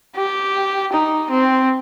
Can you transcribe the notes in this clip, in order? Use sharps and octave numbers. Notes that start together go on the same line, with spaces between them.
G4
D#4
C4